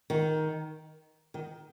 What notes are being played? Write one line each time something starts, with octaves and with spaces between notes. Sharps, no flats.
D#3
D#3